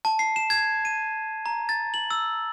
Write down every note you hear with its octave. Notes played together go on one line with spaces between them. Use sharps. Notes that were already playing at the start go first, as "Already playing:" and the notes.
A5
C7
E7
G#6
D#7
A#5
A6
F#7
E6